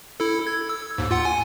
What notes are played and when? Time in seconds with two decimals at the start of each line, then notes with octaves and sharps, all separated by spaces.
0.20 E4 A4
0.47 G#6
0.69 E6
0.98 D#2 G#2
1.11 F4 F#5
1.25 G#5